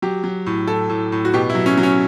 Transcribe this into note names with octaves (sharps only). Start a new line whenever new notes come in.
F#3 G4
F#3
A2
A2 A4
A2
A2
F#4
B2 G4
E4
F#3
C#4
F#3
C#4